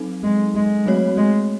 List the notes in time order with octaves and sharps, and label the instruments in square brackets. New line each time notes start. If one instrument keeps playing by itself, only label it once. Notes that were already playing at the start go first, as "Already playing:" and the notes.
Already playing: [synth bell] F#3 C4 D#4 A4
[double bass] G#3
G#3
[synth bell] F#3 A3 C4 F#4 C#5
[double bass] G#3